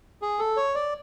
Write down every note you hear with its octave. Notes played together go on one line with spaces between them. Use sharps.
G#4
A4
C#5
D5